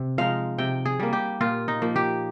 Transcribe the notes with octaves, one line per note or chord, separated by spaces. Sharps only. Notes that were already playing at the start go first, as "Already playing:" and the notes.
Already playing: C3
F3 G#3 D#4 F5
C3 G5
G#4
G3 A#3
G4
A#2 F4
D#4
F3 A#3
G4